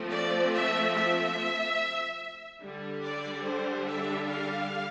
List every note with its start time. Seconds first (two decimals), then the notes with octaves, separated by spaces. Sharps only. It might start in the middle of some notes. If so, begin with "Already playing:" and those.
Already playing: F3 A3 C4
0.10 D5
0.52 E5
0.94 E5
2.61 D3 G3 D4
3.03 D5
3.44 C5
3.86 E5
4.27 F5